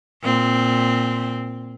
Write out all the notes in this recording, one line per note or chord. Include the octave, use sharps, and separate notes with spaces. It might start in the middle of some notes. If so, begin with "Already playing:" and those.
A#2 C4